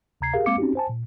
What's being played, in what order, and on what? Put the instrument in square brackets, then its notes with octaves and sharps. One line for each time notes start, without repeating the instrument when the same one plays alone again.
[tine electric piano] D2 C3 A#5 G#6 C7
G4 G#4 A#4 F5
G#3 A#3 C4 F5 D6 C#7
C4 C#4 D#4 F#4 G4
C5 G#5 A5
A#2